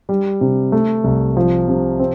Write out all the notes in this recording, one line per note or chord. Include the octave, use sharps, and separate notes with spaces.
G3
C3
A3
C2
F3
C3
C4